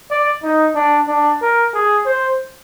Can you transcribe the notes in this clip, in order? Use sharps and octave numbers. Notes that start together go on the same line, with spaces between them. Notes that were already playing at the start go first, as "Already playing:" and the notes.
D5
D#4
D4
D4
A#4
G#4
C5